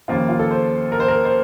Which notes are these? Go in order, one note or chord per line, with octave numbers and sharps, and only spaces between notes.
D#2 C#3 F3 A#3 F4
F4
A4
C5
A#4
C5
A#4
C5